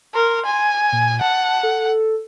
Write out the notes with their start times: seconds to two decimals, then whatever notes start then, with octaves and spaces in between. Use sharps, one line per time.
0.15 A#4 C6
0.46 G#5
0.93 A#2
1.21 F#5 A5
1.63 A4